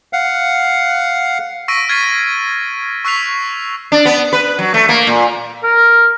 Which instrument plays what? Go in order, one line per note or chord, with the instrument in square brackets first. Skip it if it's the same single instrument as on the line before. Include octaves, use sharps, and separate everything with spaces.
[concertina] F5 F#5
[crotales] C#6 E6 A#6 B6 D7 D#7
F6 G#6 A6 B6 C7 D#7
C#6 E6 F#6 B6 C7 F7
[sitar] D4
B3
B4
F#3
A3
A#3
A#2
[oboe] A#4